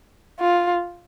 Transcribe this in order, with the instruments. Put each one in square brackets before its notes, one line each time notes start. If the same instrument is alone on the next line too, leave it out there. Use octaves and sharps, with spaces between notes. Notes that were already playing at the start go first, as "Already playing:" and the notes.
[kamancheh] F4